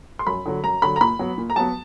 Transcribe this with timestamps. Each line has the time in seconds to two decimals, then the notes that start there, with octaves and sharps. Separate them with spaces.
0.19 C6
0.27 F#2 B5
0.46 D3 F#3
0.64 F#2 A#5
0.82 D3 F#3 B5
0.96 A#5
1.01 A#2 B5
1.19 F#3 B3
1.38 A#2
1.50 A#5
1.56 F#3 B3 A5